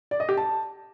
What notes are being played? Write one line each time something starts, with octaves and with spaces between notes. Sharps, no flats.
D5
D#5
G4
A5